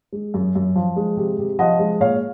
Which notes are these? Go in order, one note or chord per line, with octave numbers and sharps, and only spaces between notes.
G#3
F#2
F#2
F3
G#3
C3
C3
F3 D#5 F#5
G#3
A#2 C#5 F5